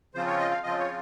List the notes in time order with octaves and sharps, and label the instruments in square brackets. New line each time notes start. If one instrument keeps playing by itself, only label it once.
[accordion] C#3 F3 C4 F4 C5
C#5
D#5
F5
C#3 F3 C4 F4 D#5
C#5